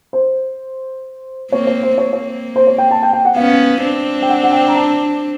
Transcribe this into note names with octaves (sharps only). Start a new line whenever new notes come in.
C5
A#3 C4 C#5
C#5
C5
A#3 C4 C#5
C#5
C5
C#5
G5
A5
G5
G5
F#5
B3 C#4 F5
C4 D4
G5
F#5
F#5
G5
A#5
A5